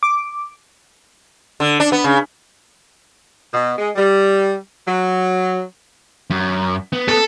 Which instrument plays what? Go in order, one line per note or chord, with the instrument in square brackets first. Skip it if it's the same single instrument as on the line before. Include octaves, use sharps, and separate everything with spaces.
[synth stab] D6
[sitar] D3
D4
B3
C#3
[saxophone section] B2
G#3
G3
F#3
[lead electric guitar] F#2
B3
[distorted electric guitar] A4